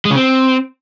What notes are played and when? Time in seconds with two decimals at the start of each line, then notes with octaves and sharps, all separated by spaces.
0.05 G#3
0.10 C#3
0.16 C4